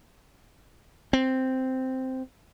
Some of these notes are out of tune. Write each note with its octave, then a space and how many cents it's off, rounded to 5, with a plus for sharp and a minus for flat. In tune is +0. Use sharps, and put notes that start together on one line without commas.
C4 -5